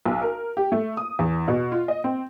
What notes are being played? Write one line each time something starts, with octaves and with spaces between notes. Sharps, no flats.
B1
A#4
G4
A3
D#6
E2
B2
F4
D#5
C4